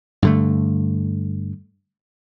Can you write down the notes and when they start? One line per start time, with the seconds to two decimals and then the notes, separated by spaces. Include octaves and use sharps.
0.22 G2 D3 A3